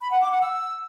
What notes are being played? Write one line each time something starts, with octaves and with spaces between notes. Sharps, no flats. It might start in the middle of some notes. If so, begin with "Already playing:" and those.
B5
F#5
D6
F#5
E6